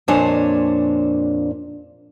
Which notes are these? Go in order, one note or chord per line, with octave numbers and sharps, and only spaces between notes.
F2 A#2 D4 C5 C#5 G#5